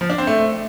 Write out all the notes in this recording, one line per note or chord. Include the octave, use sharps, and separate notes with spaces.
F3
D4
C4
A3